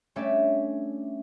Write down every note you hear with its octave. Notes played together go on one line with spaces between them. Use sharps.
G3 A3 C#4 D4 D5 E5